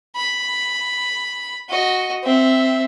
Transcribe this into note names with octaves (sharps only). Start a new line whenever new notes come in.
B5
F#4 D#5
C4 E5